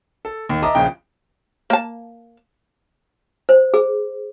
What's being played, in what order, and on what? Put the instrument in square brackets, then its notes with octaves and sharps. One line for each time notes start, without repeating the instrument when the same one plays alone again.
[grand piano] A4
D#2
D#5 E5 A5 A#5 D6 D#6
A#1 C#3 G5
[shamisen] A#3 A5
[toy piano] C5
G#4